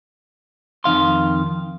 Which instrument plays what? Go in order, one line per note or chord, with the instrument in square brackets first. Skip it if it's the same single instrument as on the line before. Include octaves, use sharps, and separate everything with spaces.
[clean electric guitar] F2 D#3 F5 C6